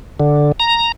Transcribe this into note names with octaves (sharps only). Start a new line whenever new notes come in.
D3
A#5